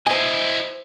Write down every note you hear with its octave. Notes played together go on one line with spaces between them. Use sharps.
E4 C5 D#5 G#5